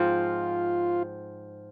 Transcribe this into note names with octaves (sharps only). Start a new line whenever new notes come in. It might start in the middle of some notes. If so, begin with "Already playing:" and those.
Already playing: G#2 F3 C4 F4